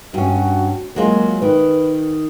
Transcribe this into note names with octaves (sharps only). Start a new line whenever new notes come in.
G2 C#4 F#4
F#3 G#3 A#3 F4
D#3 B4